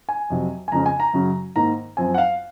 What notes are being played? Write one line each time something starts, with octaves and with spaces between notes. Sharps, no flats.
G#5
F2 C3 F#3
G#5
F2 C#3 F3 G#3 C#4 A#5
G#5
A#5
F#2 C#3 F#3 C#4
G#2 D#3 A#3 A#5
F#2 F3 C4 G#5
F#5
F5